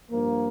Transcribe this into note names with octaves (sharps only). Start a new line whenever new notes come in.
G2 F3 A#3